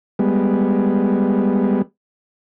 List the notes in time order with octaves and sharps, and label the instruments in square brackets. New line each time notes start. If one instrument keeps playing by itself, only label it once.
[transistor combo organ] G3 G#3 B3